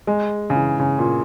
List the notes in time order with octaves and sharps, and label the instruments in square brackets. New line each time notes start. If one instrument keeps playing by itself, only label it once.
[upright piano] G#3
C#3
E3
C#3
A#2